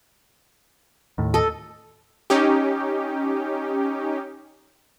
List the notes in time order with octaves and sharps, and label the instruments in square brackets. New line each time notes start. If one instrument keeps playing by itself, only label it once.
[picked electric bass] D#2 A2
[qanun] A4 D#5
[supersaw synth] C#4 D#4 G4